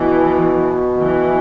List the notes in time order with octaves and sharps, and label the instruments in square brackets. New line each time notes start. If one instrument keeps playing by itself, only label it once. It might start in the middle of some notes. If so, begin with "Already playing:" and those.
Already playing: [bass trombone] B2 [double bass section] E3
[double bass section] E3